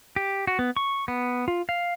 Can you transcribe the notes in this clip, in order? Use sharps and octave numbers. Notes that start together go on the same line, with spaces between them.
G4
F#4
B3
C#6
B3
F4
F5